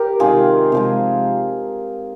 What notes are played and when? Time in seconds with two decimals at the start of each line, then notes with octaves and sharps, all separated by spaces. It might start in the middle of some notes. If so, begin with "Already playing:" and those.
Already playing: G4 A#4
0.20 C3 D#3 G#3 F4 G#4
0.72 C3 F3 G#3